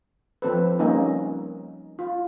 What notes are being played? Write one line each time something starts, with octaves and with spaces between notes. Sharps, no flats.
F3 C4 A4 B4
G3 A#3 C#4 D#4
F4